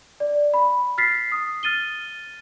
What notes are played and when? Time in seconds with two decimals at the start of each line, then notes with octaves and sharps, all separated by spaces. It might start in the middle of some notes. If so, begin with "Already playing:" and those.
0.20 D5
0.54 B5
0.98 F6 A6 B6 C7
1.32 D#6
1.63 F6 A6 D#7 G7